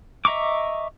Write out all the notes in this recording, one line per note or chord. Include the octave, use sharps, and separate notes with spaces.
D#5 E5 A#5 C#6 D6